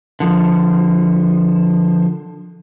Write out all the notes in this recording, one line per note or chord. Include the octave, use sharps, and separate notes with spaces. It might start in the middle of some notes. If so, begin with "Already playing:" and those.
D3 F3